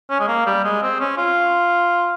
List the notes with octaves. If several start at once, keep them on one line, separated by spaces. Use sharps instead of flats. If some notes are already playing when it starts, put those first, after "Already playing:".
C#4
G#3
A#3
G3
G#3
C4
C#4
F4